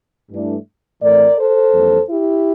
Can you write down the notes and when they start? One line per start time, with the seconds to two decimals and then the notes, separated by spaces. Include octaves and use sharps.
0.31 G2 E3 A3 D4
1.02 A2 E3 A3 C4 A#4 D5
1.37 A4 C5
1.73 F2 E3 G3 A#3
2.08 E4 G4